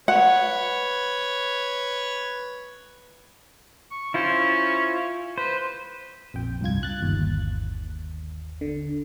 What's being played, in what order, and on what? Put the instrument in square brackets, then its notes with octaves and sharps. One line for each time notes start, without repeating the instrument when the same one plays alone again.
[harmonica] B4 C#5 [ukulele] F#5
[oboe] C#6
[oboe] C#4 [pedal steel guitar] E4 F4 C5
[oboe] B4 [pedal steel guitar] C5
[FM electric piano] A#1 F2 G5
C2 G2 F4 G#6
F#6 A6
G1 D#2
D3